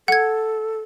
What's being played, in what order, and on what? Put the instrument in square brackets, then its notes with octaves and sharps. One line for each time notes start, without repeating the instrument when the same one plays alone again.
[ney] A4 [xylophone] F#5 G#6